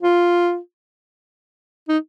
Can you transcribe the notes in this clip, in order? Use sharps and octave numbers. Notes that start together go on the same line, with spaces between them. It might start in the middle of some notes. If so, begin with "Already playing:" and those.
F4
D#4